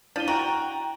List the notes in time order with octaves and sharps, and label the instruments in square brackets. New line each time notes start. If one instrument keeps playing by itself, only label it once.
[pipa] F3 [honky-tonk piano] D4 [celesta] E4 D#7 G7
[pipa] F#4 [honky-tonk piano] G5 A#5